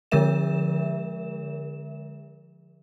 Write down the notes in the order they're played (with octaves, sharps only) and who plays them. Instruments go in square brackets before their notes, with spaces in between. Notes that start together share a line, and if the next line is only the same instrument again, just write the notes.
[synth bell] D3 F3 G#3 A#4 E5 E7